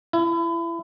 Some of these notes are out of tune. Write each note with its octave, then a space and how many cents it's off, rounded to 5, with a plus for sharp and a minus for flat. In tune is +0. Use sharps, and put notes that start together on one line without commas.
E4 +30